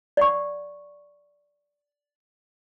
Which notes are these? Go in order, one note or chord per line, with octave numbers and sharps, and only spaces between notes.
D5 F#5 C#6